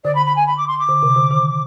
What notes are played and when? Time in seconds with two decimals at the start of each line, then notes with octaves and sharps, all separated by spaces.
0.04 D3 D5
0.15 B5
0.26 B5
0.36 G#5
0.47 B5
0.57 D6
0.67 C6
0.78 D6
0.89 D3
1.03 C3
1.16 D3
1.31 D#3